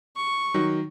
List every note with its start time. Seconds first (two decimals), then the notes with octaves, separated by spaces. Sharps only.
0.16 C#6
0.54 D#3 F#3